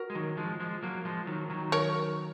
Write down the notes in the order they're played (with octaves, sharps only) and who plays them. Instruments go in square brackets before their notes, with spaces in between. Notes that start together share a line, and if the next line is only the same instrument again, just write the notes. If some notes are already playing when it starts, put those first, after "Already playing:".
Already playing: [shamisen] F#4 A#4
[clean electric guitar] G#3
D#3 F#3
F3 G#3
F3 G#3
F#3 A#3
F3 G#3
D#3 F#3
D#3 F#3
[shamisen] A#4 C#5